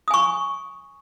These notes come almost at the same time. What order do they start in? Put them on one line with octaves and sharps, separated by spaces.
D#6 G#5 C#6